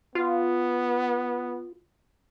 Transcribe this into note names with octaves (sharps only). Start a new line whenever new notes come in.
B3 F4